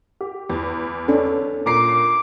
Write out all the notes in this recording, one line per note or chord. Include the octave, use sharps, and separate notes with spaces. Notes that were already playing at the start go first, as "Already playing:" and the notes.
G4
E2
C#4 D4 A4
A#2 A#5 D6 C7